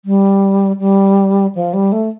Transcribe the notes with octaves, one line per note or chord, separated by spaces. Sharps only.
G3
G3
F3
G3
A3